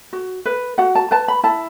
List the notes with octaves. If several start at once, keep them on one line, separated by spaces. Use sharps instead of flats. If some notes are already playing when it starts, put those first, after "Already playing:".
F#4
B4
F#4 F#5
A5
B4 A5
B5
E4 A5